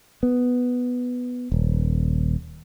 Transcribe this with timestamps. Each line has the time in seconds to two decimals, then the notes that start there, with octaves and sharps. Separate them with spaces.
0.23 B3
1.52 D#1